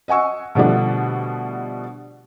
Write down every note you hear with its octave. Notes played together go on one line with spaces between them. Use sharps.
D#5 F#5 G#5 C#6 E6
B2 D3 F3 G3 A3 D4